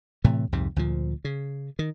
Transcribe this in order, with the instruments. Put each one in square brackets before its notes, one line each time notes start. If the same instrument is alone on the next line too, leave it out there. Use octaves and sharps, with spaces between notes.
[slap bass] A2 C3 E3 A3
C2 F2 G#2 C3
D2 A#2 F3
C#3
D#3